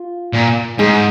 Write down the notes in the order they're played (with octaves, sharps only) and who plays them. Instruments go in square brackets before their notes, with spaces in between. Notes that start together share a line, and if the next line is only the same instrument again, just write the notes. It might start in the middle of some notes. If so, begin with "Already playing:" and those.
Already playing: [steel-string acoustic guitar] F4
[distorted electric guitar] A#2
[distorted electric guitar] G#2 [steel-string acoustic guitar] D#4 G#4